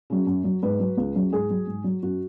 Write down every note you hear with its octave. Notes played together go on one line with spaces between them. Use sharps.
C#3 F#3
F#2
F#3
G#2 B4
F#3
C#2
C#3 F#3
G#2 G#4
F#3
G#2
F#3
F#2 F#4